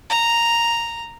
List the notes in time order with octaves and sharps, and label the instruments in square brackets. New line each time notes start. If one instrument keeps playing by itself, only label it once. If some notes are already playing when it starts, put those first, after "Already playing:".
[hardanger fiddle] A#5